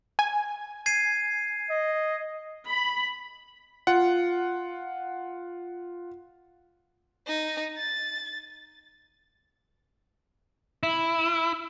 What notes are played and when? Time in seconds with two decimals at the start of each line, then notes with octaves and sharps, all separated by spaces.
0.19 G#5
0.86 G#6 C7 D#7
1.70 D#5
2.65 B5
3.87 F4 F#5
7.27 D#4
7.77 A6
10.83 E4